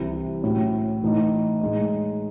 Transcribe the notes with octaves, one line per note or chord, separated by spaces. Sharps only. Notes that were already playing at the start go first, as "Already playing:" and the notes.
Already playing: C2 C3 E3 C4 E4
A2 F#3 C#4 E4
A2 E3 A3 D#4
A2 G#3 D#4